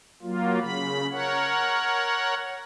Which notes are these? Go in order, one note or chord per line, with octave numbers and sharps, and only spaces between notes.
F#3 A#3 F4
C#3 B5
A#4 C#5 F#5